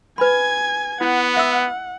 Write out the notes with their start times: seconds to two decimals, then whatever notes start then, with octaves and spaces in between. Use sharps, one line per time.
0.18 B4 G#5 B5 G#6
1.01 B3 E4 F#5
1.37 E5 E6